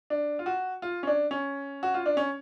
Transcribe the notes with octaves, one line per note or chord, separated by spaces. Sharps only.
D4
F4
F#4
F4
C#4
D4
C#4
F#4
F4
D4
C#4